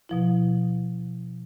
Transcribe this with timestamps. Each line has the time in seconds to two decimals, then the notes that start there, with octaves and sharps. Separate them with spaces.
0.09 B2 F3 E4